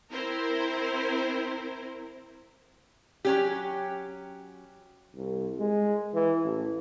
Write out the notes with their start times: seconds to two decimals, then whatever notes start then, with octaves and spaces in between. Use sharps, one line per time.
0.11 C4 E4 A#4 C5
3.25 F#3 C#4 G4
5.15 C2
5.60 G#3
6.14 E3
6.44 A1